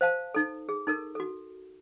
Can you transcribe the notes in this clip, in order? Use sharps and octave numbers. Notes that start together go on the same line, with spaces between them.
C5 F5 A5
D#4 A4
G#4
D#4 A4 A#4
F#4 A4